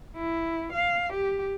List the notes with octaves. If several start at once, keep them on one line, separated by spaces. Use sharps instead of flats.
E4
F5
G4